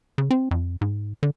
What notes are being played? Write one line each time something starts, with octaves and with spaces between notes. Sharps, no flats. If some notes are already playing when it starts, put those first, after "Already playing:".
C#3
C4
F2
G#2
D3